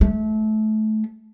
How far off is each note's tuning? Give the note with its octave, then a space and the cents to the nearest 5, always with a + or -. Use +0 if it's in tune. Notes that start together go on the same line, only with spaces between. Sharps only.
A3 -25